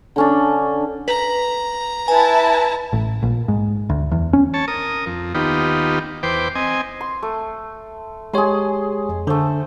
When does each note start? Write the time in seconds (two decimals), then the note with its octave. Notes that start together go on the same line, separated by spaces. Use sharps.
0.16 D3 C#4 D4
1.08 B4 A#5
2.08 E4 B4 G#5 A5
2.93 A1
3.23 A#1
3.48 G#2
3.90 D2
4.11 E2
4.33 C#4
4.54 C#5 A5
4.68 A#4 D#6
5.06 F2
5.35 D#2 B3 D#4 F4 G4
6.23 E2 B4 C5 G5 D6
6.55 C4 D#5 G#5
7.01 C6
7.22 A3
8.34 G#3 G4 G#4 C#5 C6
9.09 F2
9.27 D3 A3 C5